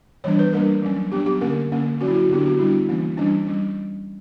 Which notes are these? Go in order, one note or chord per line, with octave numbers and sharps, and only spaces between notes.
E3 G3 B3 D4 C#5
B4
G3 A#3 D4 A#4
F#3 C#4
F#3 B3 D4 G4
G4
D3 A#3 C#4 A#4
D3 A#3 C#4
F#3 C#4 F#4
E4
F#4
D3 F#3 B3 D4 G4
F#4
G3 B3 D4 E4
E3 A#3 C#4
E3 G3 C#4 D4
G3 C#4